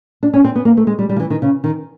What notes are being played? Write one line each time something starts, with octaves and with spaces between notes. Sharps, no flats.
D4
C#4
C4
B3
A#3
A3
G#3
G3
G3
F3
E3
D#3
C#3
D#3